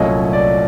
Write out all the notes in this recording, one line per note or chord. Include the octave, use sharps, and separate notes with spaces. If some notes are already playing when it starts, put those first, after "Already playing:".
Already playing: C2 A#2 F#3 A3 C#4 D#5
D5